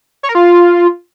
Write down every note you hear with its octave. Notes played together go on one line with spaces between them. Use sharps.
C#5
A#4
F4